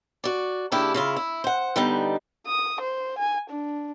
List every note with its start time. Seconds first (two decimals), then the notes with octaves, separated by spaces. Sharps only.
0.24 F#4 D5
0.72 C#3 A#3 D4 E4 G4
0.94 C#3 E4 F4
1.16 E4
1.44 C5 F#5
1.76 D3 G3 B3 D#4
2.46 D#6
2.81 C5
3.18 G#5
3.50 D4